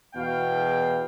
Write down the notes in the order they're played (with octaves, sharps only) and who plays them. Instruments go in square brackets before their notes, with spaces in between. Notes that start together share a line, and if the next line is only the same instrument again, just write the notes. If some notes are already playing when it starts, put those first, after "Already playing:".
[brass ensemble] E2 B2 F5 G5